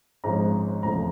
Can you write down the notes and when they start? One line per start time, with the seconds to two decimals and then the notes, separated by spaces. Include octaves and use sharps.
0.24 G#1 G#2 F3 G#3 C#4 A#5
0.83 F1 E2 C#3 F3 A3 A#5